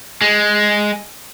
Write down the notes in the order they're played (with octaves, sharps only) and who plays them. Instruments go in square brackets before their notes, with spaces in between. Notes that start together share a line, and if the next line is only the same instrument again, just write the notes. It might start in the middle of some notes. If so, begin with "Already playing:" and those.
[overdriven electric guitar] G#3